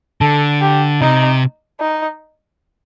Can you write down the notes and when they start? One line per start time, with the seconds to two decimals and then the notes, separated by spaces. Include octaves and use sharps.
0.21 D3 A4
0.61 G4
1.01 C3 D#4
1.80 D#4